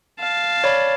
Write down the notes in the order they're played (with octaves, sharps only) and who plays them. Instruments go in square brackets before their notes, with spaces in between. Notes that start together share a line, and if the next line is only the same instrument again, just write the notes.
[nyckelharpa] F5 A5
[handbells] C#5 D5 B5